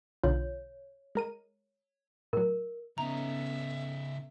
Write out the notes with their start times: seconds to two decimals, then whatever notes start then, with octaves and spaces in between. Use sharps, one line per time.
0.24 B1 D3 F4 C#5
1.15 G#3 A#4 D#7
2.33 A2 F#3 A#4
2.98 C#3 B3 C#4 D#4 A4 E5 A#5